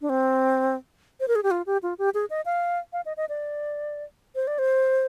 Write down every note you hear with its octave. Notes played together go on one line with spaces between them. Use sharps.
D4
C4
C5
A#4
G#4
G4
F4
G4
F4
G4
G#4
D#5
F5
F5
D#5
D#5
D5
C5
D5
C5